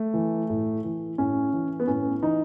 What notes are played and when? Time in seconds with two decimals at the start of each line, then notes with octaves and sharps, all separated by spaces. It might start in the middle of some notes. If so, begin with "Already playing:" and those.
Already playing: A3
0.14 E3
0.49 A2
0.84 E3
1.18 A2 C#4
1.53 E3
1.80 B3
1.87 A2 C#4
2.22 E3 D#4